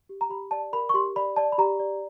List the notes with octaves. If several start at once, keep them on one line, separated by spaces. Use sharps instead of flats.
G4
A#5
G4 B5
D5 A5
A#4 B5
C#6
G4 C6
D5 B5
D5 A5
B5
G4 A#5
D5